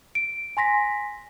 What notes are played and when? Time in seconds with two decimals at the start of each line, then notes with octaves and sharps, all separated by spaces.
0.15 D7
0.57 G#5 C6 A#6 B6